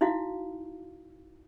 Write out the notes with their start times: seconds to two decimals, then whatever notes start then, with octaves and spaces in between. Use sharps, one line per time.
0.01 D#4 E4 F#4 F5